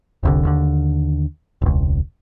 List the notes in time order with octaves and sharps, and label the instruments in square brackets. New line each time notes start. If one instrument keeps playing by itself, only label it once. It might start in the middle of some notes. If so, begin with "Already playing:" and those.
[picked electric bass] F1 C2 D3
D#2 D3
E1 C#2